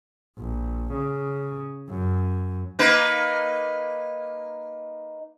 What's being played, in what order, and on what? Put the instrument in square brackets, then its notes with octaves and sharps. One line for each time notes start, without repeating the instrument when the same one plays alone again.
[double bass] A#1
C#3
F#2
[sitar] A#3 D#4 B4